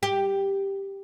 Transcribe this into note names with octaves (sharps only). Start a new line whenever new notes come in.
G4